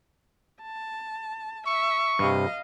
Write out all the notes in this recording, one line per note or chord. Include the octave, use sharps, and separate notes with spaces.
A5
E5 C#6
G2 C3 D#5 F5